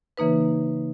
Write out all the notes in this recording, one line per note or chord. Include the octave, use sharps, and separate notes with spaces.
C#3 E3 A#3 D#4 B4